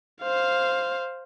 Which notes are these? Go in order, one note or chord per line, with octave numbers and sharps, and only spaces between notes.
C5 F5